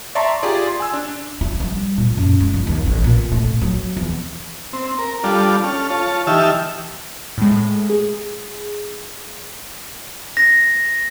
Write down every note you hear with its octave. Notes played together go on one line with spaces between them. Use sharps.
D5 E5 A5 A#5 C6 C#6
F4 G4 G#4 D5
C6
G#5 E6
D4
E4
G3
A#2
F#2
G#3
G1
D#2
A1
A#2
A2
F#3
E2
C4
A#4
G3 D4 F4 A4
C#4 A4 F6
F4 C#5 A5
E3 D#4 G4 E5 A5 F6
A2 G#3
G#4
A#6